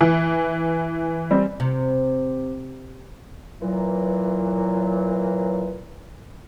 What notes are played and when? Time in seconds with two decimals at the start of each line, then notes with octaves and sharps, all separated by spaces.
0.01 E3
1.31 G3 C4
1.60 C3
3.61 A#2 E3 F#3